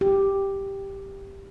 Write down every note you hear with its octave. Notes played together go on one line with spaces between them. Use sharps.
G4